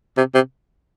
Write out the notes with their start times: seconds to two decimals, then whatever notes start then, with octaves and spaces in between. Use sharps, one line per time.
0.18 C3
0.35 C3